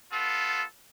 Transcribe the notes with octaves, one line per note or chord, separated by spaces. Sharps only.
B3 F4 A4